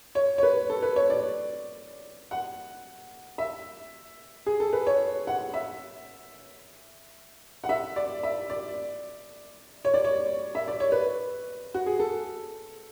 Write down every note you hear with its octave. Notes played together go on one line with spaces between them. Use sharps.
C#5
C#5
B4
A4
B4
C#5
D5
F#5
E5
G#4
A4
B4
C#5
F#5
E5
F#5
E5
D5
E5
D5
C#5
D5
C#5
E5
D5
C#5
B4
F#4
G#4
A4